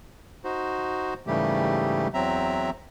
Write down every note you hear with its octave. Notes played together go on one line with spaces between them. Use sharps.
D#4 F#4 C5
G#2 C#3 E3 G3 A3 G4
E2 F#3 C4 E5 A#5